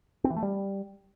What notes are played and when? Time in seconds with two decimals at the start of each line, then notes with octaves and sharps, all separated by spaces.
0.24 C4
0.30 E3
0.36 A3
0.43 G3